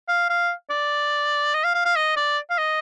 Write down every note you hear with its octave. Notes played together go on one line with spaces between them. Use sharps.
F5
F5
D5
D#5
F5
F5
F5
D#5
D5
F5
D#5